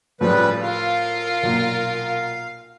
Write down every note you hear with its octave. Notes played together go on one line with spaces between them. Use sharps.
A2 C#3 F3 G3 B4
F4 A#4 F5
B1 A#2